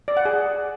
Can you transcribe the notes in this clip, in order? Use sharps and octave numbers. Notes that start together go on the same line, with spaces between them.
D5
F#5
G#4